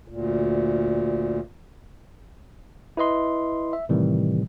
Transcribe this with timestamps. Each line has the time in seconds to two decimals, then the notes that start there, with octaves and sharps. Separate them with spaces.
0.08 D2 A#2
2.97 E4 B4 D#5 C6
3.73 E5
3.89 A2 C3 D#3 E3 G3